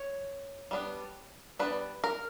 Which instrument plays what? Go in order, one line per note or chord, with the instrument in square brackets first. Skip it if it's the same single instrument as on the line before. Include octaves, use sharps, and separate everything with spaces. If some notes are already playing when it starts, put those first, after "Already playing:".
Already playing: [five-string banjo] C#5
G3 B3 D4
G3 B3 D4 B4
A#4